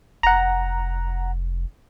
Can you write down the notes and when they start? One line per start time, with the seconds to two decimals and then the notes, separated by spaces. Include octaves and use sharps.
0.23 F1 F#5 A#5